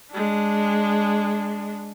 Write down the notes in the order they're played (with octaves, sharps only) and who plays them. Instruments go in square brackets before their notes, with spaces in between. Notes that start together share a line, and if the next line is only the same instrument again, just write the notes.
[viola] G#3 D4